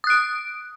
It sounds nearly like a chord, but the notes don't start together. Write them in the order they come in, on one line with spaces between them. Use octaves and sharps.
D#6 F#6 D7